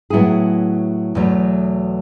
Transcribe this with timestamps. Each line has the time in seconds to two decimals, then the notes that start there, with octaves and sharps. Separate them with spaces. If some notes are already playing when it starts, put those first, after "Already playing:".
0.10 A2 F#3 B3 E4 G#4
1.15 E2 B2 F#3 A3